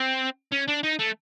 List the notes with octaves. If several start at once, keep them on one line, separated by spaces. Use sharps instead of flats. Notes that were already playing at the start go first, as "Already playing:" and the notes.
Already playing: C4
C#4
D4
D#4
A3